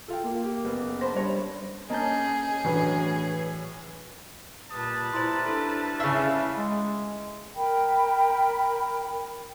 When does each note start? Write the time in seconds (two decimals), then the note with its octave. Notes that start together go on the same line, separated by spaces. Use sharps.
0.08 F4 A4 F5 G5
0.24 A#3
0.44 G4
0.65 F#1 B3
1.01 C5 A5 B5 A#6
1.13 G3 D4 C#5
1.90 A#3 C#4 G#4 D#5 A5 G6
2.64 A2 E3 F#3 D4 B4
4.71 A#2 G3 B4 A5 D#6
5.13 E4 C5 A#5 C6
5.46 D4 E4 A4
6.00 C#3 E5 F5 F6 C7
6.57 G#3
7.56 A#4 G5 B5